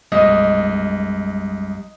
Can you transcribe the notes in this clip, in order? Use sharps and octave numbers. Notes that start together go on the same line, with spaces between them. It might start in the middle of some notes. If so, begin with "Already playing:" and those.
B1 F#2 G3 G#3 D#5